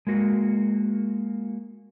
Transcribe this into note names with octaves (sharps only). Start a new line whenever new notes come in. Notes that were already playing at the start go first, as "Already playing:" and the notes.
G#3 A#3 F#4